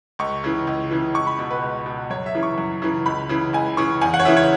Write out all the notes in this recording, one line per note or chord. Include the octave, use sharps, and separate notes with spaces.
C#2 C#6
C#3 E3
C#2
C#3 E3
C#2 C#6
B5
B2
B4
C#2
B2
F#2 C#5
E5
C#3 E3
C#6
F#2
C#3 E3
C#2 B5
C#3 E3
C#2 G#5
C#3 E3 C#6
E2 G#5
F#5
C#5
C#3 E3 E5
C#5